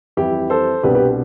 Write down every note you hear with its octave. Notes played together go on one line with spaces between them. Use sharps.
F2 E3 G3 E4 G4
A4 C5
C2 B2 B3 D4 G4 B4
G4 B4